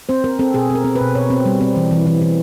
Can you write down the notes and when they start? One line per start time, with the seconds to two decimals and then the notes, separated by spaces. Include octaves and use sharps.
0.09 C4 C5
0.24 C4 A#4
0.39 C4 A4
0.54 B2 G#4
0.70 C4
0.75 A#4
0.84 C4
0.95 B2 B4
1.15 B2 C#5
1.30 C4
1.46 G3
1.61 C4
1.76 E3
1.91 E3
2.07 E3
2.22 E3